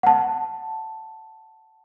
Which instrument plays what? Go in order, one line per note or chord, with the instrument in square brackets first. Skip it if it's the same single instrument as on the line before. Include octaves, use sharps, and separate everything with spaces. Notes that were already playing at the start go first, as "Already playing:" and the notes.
[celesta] F#5 A5